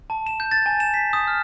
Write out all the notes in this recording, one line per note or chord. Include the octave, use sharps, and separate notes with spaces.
A5
E7
G6
A6
G#5
E7
B6
D#6
F6